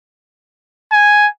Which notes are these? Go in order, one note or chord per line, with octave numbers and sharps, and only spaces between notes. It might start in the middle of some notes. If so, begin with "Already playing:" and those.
G#5